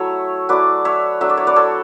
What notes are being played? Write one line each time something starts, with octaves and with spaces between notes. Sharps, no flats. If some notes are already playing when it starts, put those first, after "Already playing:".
Already playing: F#3 A3 E4 C#5 E5
F#3 A3 E4 B4 D5
C#5 E5
F#3 A3 D4 E5
D5
C#5
B4 D5
A4 C#5